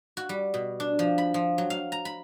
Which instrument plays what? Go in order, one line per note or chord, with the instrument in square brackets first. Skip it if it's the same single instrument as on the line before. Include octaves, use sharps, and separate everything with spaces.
[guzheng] F#4
G3
B2
D4
F3
B5
F3
F#3
F5
A#5
B5